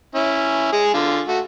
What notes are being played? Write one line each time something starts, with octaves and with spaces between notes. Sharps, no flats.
C#4 E4
G#3 G#4
D3 F4
A3 F#4